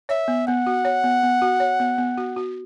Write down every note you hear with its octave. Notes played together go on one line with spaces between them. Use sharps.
C#5 E5
B3
B3 F#5
F#4
C#5
B3
B3
F#4
C#5
B3
B3
F#4
F#4